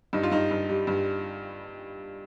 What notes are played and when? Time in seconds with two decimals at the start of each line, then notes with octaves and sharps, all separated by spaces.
0.13 G2 D#4
0.23 F4
0.31 G2 D#4
0.51 G2
0.69 G3
0.87 G2